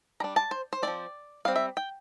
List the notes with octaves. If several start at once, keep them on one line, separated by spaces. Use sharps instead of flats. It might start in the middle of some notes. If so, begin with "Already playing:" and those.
G3 D4 A#5
A5
C5
C5
A3 C4 D5
F3
G3 C4 F5
E5
G5